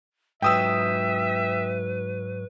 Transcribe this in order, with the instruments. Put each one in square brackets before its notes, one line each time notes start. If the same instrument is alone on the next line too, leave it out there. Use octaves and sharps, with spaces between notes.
[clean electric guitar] G#2 F#3 [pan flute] B4 [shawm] E5 [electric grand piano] G5 D#6 E6